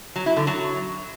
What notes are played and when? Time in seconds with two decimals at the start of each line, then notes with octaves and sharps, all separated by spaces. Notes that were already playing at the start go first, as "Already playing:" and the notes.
0.16 F#3
0.26 E4
0.37 D3
0.47 F#3